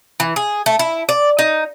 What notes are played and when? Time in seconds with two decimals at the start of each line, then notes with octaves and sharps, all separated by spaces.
0.20 E3
0.36 G#4
0.66 A3
0.79 E4
1.09 D5
1.39 D#4